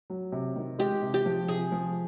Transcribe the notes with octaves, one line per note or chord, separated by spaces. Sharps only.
F#3
C3
D#3
G#3 G4
C3
G4
F3
C3 G#4
F3